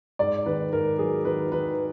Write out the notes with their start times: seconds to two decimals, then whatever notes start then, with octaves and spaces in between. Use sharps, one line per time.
0.19 G#2 D5
0.46 D#3 B4
0.73 G#2 A#4
0.98 F#3 G#4
1.25 D#3 B4
1.52 D#3 B4